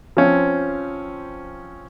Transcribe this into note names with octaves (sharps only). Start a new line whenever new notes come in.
F3 C4 C#4